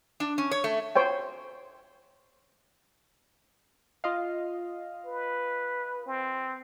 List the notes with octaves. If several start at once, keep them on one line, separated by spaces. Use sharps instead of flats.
D4
C#4
C#5
A3
C5 C#5 G5
F4 D#5 F5
B4
C4